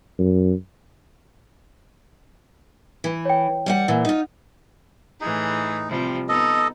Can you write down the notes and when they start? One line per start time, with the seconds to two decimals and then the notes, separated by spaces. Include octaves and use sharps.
0.18 F#2
3.04 E3
3.25 C#5 G5
3.66 G3 F5 F#5
3.88 A#2 E3 F#5
4.05 D#4 F4
5.21 A2 E3 D#4 G#4
5.88 C3 F3 G3
6.29 B3 D#4 A4 D#5